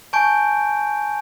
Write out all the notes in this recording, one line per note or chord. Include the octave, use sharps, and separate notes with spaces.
G#5 A5 C#6 G6 D7